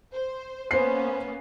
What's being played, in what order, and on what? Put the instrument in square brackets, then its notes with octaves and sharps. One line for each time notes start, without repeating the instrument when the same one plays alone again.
[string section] C5
[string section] A#3 B3 C#4 [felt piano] C5 C7